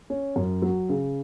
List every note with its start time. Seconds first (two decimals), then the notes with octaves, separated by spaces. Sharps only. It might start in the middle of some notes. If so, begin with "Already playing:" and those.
0.10 C#4
0.36 F#2
0.62 F#3
0.89 C#3